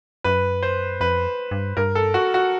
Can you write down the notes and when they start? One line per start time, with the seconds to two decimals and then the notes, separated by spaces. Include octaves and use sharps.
0.24 F#2 B4
0.63 C5
1.01 F2 B4
1.51 G2
1.77 G2 A#4
1.95 A4
2.14 F#4
2.34 F#4